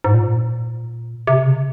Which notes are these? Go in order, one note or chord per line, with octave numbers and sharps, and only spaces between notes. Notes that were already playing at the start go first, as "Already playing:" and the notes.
G#2
A#2
C3
C#3